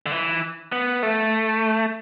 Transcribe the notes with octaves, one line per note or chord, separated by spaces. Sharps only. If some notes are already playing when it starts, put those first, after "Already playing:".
D3
E3
B3
A3